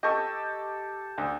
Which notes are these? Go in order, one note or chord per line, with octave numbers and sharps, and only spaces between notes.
G4 A4 D#5 C#6 E6
D2